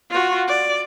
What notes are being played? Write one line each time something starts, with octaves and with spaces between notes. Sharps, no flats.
F4 F#4
D5